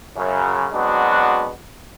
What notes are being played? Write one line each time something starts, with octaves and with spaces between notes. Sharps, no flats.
F#2 C#3
F#3 G#3 B3 C4 D4 F#4